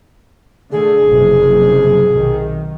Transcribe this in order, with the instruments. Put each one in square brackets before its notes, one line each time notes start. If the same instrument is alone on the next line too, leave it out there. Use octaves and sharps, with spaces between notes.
[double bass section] D3 A3 [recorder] G#4
[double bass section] F#1 F2 C3
B1 C3 D#3